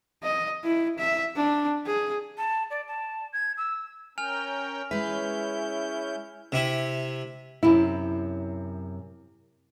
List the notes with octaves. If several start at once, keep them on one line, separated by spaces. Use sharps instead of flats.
D#5
E4
E5
D4
G#4
A5
D5
A5
G#6
E6
C#4 A#4 G5 G#5 F6 F7
G#3 C#4 E4 B4 G6
C3 E4
F#2 C3 E4